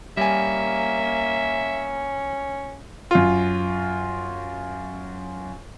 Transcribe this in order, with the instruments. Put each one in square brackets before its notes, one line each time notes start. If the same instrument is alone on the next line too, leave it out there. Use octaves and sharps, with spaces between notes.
[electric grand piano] G3 G#5 [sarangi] A#3 [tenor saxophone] C#4 [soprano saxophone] E5
[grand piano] F#2 F4